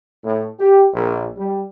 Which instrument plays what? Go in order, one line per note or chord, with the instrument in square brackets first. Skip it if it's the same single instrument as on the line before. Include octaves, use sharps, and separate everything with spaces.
[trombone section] A2
G4
A#1
G3